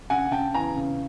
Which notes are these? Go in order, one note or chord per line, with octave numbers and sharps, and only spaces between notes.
C#3 F#5 G#5
C#3 G5 A5
E2 G#5 A#5
C#3